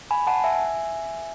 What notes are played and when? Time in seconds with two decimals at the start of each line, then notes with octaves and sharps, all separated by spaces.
0.11 G#5 B5
0.27 F#5 A5
0.44 E5 G#5